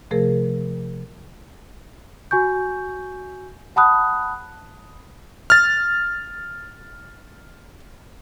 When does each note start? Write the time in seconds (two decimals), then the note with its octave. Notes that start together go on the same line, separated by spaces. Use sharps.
0.11 C3 F3 A3 G#4 A#4
2.31 F#4 G#5 C#6 G6
3.76 F#5 A5 B5 D#6 F#6
5.50 F6 A6